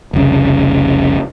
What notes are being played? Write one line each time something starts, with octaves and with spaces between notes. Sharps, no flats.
F1 C2 C#3